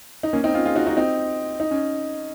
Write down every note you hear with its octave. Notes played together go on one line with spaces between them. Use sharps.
D#4
A#3 C#4
C4 D#4
C#4 F4
F4 G#4
D#4 F#4
D#4 F#4
C4 D#4
D#4
C#4